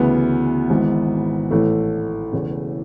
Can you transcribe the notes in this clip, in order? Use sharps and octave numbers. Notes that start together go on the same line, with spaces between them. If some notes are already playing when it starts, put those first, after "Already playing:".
Already playing: D2 C#3 E3 B3
G#1 G#2 E3
A1 A2 E3 A3
E1 E2 C#3 E3